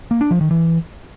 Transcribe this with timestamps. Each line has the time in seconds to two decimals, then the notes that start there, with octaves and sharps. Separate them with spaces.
0.11 A#3
0.21 D4
0.31 F3
0.41 D#3
0.51 E3